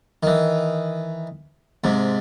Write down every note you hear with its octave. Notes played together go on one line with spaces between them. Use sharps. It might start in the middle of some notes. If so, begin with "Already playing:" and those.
D#3 E3
G#2 C3